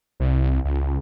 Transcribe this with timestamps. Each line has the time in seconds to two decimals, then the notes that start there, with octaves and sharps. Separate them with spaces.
0.20 C2
0.65 C#2